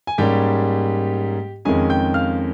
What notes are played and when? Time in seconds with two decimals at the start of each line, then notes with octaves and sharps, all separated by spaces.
0.07 G#5
0.18 G#2 G3 A#3 C#4 G4 G5
1.65 F2 D#3 G#3 C#4 G#4 G#5
1.90 G5 G6
2.14 F5 F6